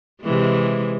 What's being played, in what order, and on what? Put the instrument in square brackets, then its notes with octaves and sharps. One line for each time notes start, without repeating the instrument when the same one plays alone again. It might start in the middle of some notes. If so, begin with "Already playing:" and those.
[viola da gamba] C3 E3 G#3